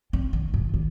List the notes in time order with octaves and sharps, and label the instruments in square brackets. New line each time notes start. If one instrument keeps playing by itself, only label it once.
[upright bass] C4
D#3
G#2
D#3